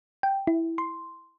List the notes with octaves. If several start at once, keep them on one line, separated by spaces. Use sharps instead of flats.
G5
E4
C6